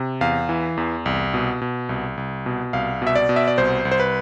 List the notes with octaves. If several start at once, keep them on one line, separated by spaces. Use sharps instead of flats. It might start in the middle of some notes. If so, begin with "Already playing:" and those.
Already playing: C3
E2 F5
E3
E2
C2
B2
B2
C2
C2
B2
C2 F5
B2 E5
D5
B2
E5
D5
C2 C5
C2
C5
B4